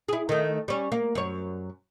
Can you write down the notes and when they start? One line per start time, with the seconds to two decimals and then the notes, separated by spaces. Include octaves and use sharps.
0.08 E4 G#4
0.29 D#3 A3
0.68 G3 C#4
0.92 A#3
1.15 F#2 C#5